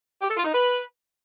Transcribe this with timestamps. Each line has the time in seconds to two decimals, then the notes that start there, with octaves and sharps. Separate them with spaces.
0.21 G4
0.29 A4
0.37 F4
0.44 D#4
0.52 B4